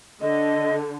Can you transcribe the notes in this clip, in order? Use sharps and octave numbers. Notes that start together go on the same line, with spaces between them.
D3 D#5